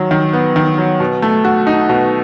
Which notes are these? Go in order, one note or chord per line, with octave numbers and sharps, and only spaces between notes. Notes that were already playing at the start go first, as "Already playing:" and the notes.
Already playing: D#3 F#3
D#3
B3
D#3
F#3
B2
A3
F#4
D#4
B2